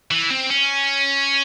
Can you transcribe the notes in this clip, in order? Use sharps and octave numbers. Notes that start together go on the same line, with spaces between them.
E3
C4
C#4